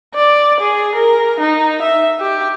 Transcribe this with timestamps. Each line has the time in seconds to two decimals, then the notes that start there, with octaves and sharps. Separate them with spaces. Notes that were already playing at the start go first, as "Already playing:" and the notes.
0.14 D5
0.60 G#4
0.95 A#4
1.39 D#4
1.82 E5
2.20 G4